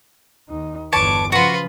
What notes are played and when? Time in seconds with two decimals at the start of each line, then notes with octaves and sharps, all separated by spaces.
0.49 D#2 D#4
0.92 G1 E2 B4 C#5 A5 D6
1.32 C#3 F3 F4 F#4 B4 C6